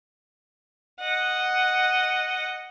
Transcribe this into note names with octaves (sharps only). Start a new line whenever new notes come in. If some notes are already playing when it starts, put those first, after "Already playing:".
D#5 F#5